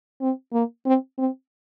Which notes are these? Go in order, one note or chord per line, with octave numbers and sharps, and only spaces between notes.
C4
A#3
C4
C4